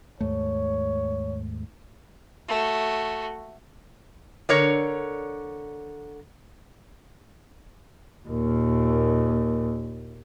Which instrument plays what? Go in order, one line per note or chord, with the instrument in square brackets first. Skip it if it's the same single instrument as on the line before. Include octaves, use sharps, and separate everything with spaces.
[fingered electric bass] D#2 G#2 A3 [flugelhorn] C#5
[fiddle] A3 F#4
[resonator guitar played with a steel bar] D3 A#4 C#5
[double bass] D#2 A#2